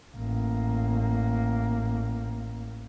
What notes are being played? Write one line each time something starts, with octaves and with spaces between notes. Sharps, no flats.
A1 A#3